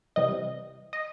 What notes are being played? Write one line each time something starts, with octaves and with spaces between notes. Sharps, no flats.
C3 E3 G3 D#5
D#5